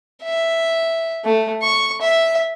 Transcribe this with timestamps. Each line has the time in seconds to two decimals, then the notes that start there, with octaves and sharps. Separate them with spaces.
0.23 E5
1.25 A3
1.63 C#6
2.02 E5